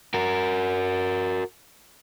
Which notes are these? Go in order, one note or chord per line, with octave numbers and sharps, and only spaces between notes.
F#4 A#4